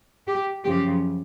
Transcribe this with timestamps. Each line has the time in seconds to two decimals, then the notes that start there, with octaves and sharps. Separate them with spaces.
0.27 G4
0.64 F#2 C#3 F3 G4